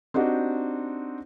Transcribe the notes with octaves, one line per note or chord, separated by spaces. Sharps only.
C4 D4 D#4 F#4 G4